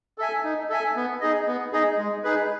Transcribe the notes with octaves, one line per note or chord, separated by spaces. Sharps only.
A4 E5 G#5
D#4
A4 E5 G#5
B3
D#4 G#4 D#5
B3
D#4 G#4 D#5
G#3
D#4 G#4 B4